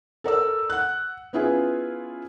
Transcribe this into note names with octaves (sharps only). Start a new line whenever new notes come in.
A4 A#4 D5 E6
F#5 F#6
B3 C#4 E4 F4 G#4 B4